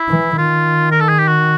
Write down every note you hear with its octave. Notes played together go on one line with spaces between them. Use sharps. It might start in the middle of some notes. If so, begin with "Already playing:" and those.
Already playing: E4
E3
D#3 F4
A#4
A4
G#4
G4
F#4